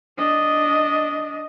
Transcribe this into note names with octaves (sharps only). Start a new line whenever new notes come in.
D4 D#5